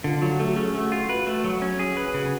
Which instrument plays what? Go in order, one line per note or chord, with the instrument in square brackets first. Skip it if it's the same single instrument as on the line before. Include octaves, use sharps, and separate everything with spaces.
[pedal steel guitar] D3 [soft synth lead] F4
[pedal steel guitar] F#3 [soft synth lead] F#4
[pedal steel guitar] A3 [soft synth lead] A4
[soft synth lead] F#4
[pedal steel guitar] C#4 [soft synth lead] G#4
[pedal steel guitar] A3 [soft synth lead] F#4
[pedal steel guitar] F4
B4
A3
F#3
C#4
G#4
B4
C#3